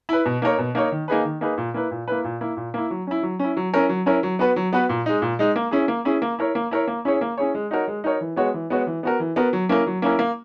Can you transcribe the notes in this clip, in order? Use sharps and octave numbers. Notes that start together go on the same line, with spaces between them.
E4 B4
B2
A#3 D#4 A#4 C#5
B2
A#3 D#4 A#4 C#5
D#3
A#3 D#4 G#4 B4
D#3
A#3 D#4 G#4 B4
A#2
A#3 E4 B4
A#2
A#3 E4 B4
A#2
A#3 E4
A#2
A#3 E4
F#3
C#4 E4
F#3
C#4 E4
F#3
C#4 E4 A#4 C#5
F#3
C#4 E4 A#4 C#5
F#3
B3 F#4 B4
F#3
B3 F#4 B4
A#2
G#3 D#4
A#2
G#3 D#4
A#3
C#4 E4 G#4
A#3
C#4 E4 G#4
A#3
E4 A#4 C#5
A#3
E4 A#4 C#5
A#3
C#4 E4 G#4 C#5
A#3
C#4 E4 G#4 C#5
G#3
D#4 F#4 A#4 C#5
G#3
D#4 F#4 A#4 C#5
E3
G#3 B3 F#4 C#5
E3
G#3 B3 F#4 C#5
E3
B3 F#4 A#4
E3
B3 F#4 A#4
F#3
A#3 C#4 E4 A#4
F#3
A#3 C#4 E4 A#4
A#3